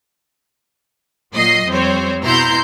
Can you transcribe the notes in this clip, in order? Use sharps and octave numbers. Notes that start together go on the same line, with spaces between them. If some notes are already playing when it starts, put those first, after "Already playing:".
A#2 F#3 D#5 C7
F2 G3 C4 C5 C#5
B2 E4 A#5 C6 G6